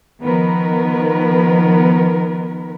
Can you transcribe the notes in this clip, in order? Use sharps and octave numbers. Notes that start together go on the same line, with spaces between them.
D#3 F3 B3 A#4 B4